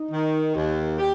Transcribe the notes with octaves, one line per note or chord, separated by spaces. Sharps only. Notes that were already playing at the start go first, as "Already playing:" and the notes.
Already playing: D#4
D#3
D#2
G4